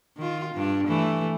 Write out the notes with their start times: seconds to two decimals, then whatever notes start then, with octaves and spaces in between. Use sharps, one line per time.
0.18 D#3 F4
0.55 G2 D4
0.88 E3 A3